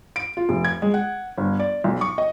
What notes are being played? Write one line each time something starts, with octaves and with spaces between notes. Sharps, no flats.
D7
F4
F1
G#6
G#3
F#5
G1
D5
B1
C#6
D#5